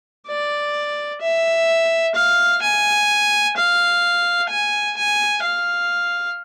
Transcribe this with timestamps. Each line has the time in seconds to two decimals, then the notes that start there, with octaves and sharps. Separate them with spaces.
0.27 D5
1.21 E5
2.15 F5
2.62 G#5
3.56 F5
4.49 G#5
4.97 G#5
5.43 F5